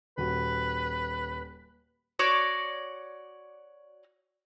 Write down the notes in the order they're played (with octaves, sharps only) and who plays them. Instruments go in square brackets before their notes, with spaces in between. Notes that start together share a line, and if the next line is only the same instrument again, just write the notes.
[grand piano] D#1 F#4 [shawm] B4
[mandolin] F#4 C#5 D5